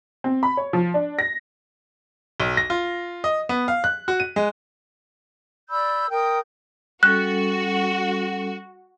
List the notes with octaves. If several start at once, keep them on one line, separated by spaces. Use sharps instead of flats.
C4
B5
C#5
F3
D4
A#6
B1
A#6
F4
D#5
B3
F5
F#6
F#4
D#7
G#3
D5 B5 E6 G6
A#4 G5 D#6 G6
G3 C#4 F#4 A4 F#6